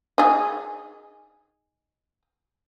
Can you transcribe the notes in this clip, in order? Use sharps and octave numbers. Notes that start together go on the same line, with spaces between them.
D#4 G#4